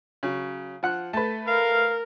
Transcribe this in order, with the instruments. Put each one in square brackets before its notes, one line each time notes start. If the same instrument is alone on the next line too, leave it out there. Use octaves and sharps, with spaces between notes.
[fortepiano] C#3 F#3
F3 F#5 F#6
[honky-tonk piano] A3 B4 [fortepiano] A5
[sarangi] A#4 [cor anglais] F5